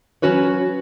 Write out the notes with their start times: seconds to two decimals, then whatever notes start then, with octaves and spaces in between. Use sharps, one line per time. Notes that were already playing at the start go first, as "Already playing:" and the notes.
0.22 F#3 C4 C#4 F#4 B4 C#5